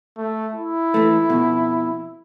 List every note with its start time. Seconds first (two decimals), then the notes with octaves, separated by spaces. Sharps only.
0.17 A3
0.54 E4
0.94 E3 A3
1.29 F2 B2